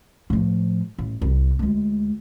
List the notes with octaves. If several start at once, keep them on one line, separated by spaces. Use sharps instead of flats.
A2 F3
A1
C2 G3
D2 G#3